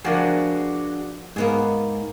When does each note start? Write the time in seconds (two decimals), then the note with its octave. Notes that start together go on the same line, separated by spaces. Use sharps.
0.04 F3 D4 F#4 G#4 A#4
1.36 G#2 A#3 B3 G#4